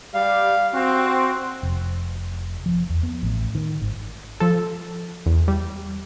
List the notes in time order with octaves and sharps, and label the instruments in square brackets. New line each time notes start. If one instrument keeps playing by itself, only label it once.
[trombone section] G3 [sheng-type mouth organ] F5
[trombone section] C4 [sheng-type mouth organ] F#4
[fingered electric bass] F1
F3
E2
B3
A1
D#3
G#1
[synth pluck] F3 A4
E2
G3